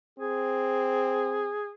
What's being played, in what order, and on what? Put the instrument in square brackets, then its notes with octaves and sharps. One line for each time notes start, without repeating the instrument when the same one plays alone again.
[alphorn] C4 [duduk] G#4